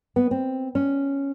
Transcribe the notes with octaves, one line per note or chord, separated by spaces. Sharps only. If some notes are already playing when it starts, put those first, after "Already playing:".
B3
C4
C#4